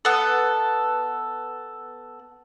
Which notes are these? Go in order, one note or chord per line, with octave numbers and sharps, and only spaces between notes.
B3 A4